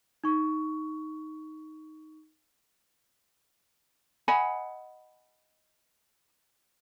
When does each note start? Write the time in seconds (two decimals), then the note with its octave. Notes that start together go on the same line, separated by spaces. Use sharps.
0.24 D#4 C#6
4.28 D#5 F#5 G#5 B5